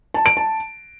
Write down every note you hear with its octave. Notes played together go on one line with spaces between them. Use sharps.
A5
D7
A5